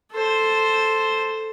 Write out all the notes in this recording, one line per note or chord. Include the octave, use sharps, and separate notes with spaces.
A4 C5